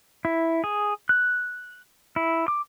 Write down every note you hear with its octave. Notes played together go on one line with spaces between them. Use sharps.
E4
G#4
F#6
E4
D6